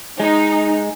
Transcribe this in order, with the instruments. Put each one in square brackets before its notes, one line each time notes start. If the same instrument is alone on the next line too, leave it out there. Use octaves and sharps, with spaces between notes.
[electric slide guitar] G#3 [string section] D#4